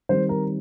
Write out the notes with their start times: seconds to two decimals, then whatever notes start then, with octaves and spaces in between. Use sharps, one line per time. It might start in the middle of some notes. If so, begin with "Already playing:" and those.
0.09 D#3 G3 C4 C5
0.29 A#4